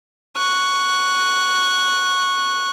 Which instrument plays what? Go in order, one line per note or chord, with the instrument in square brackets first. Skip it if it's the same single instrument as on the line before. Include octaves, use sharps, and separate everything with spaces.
[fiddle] C#6 F#6